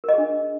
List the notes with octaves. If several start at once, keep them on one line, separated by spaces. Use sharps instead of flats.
D4 G#4 A#4 D#5